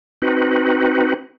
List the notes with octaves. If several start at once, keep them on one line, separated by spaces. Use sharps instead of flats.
C4 D#4 F#4 B4